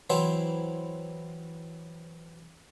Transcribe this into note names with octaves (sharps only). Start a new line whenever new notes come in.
E3 F#3 C4 E4 C5 E5